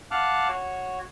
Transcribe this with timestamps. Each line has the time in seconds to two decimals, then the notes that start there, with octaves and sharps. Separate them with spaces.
0.11 F5 F#5 A5 D6 F6 F#6
0.49 F#4 C#5